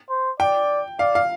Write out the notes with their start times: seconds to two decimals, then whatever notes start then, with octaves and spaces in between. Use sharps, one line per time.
0.10 C5
0.40 D5 G5
0.99 D5 F5
1.15 F5